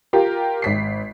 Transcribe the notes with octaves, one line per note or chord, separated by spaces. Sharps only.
F4 G4 A#4
G#1 B6 C7